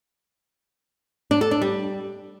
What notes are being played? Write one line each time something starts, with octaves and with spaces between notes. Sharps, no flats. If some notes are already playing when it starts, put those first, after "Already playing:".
D4
A4
D4
G3